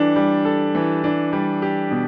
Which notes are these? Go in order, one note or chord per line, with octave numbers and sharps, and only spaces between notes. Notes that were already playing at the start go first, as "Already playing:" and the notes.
Already playing: E3 G3 D4 A4
G3
A4
E3
D4
G3
G4
B2